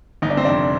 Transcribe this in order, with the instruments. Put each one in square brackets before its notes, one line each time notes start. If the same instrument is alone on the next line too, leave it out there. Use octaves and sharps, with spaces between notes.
[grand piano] G1 D#4
D4
C4
F2 C3 D4